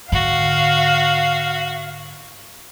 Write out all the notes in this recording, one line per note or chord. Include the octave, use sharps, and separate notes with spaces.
G#2 D3 F#4 F5